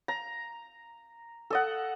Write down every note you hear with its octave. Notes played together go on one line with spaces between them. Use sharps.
A#5
A4 D#5 F#5